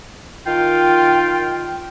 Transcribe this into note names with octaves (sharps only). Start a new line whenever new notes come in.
D#3 F4 G5